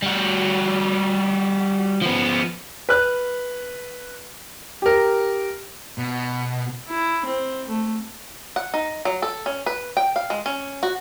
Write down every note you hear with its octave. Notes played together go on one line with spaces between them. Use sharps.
G3 F#4
F3 B3
B4 F6 F#6
G4 A#4
B2
E4
C4
A3
F#5
D#4
F#3
A4
C#4
B4
G5
F5
G#3
C#4
F#4